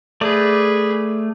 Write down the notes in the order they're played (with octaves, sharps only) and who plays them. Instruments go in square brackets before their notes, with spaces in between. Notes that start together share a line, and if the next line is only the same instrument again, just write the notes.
[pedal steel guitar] A3 D5 [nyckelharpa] G#4 B4